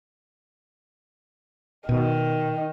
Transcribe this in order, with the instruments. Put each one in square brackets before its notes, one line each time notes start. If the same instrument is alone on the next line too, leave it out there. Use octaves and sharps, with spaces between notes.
[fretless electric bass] B2 [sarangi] D#3